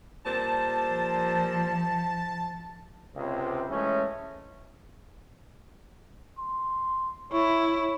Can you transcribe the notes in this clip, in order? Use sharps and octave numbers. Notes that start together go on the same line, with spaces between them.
A#2 G3 C5 A5
F3
C#2 C3
E3 G#3 A3 C#4
C6
E4 C#5